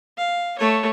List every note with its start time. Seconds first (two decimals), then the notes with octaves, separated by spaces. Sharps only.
0.18 F5
0.58 A3 C#5